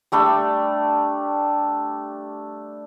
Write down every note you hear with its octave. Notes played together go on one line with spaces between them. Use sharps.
G3 A3 D4 B5